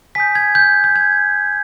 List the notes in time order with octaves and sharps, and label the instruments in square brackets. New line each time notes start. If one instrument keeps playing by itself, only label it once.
[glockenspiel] G#5 D#6 G6 B6
G#6
G6
G6
G#6